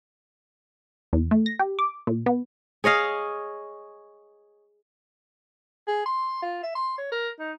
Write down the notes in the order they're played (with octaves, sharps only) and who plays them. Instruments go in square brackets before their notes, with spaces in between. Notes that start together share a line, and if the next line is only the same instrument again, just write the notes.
[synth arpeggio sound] E2
A3
A#6
G4
D6
A#2
B3
[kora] G#4 C#5 D#5 F5
[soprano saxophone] G#4
C6
F4
E5
C6
C#5
A#4
D#4